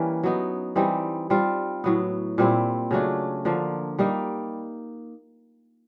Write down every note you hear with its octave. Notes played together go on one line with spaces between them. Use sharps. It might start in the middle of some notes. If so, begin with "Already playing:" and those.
Already playing: E3 G3 A#3 C#4
F#3 B3 D#4
E3 G3 C4 D#4
G3 C4 F4
A2 F#3 B3
A#2 G3 C4 E4
C#3 F#3 A3 D4
D3 F3 A#3
G3 A#3 D#4